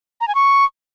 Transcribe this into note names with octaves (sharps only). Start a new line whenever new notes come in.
A#5
G#5
C#6